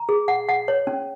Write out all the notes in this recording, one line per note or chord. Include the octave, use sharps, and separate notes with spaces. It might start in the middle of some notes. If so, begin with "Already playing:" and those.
Already playing: A#5
G#4
F#5
F#5
C#5
C#4